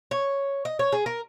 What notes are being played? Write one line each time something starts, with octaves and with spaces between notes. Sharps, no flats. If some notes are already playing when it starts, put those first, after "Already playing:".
C#5
D#5
C#5
G#4
A#4